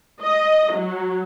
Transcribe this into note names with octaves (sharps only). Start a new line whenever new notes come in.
D#5
F#3